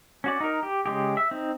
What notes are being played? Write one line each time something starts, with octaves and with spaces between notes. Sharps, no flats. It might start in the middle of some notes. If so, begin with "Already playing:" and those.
C#4 F#4 D5
D#4 A#4
G4
C#3 G#3 G4
E5
C4 D#4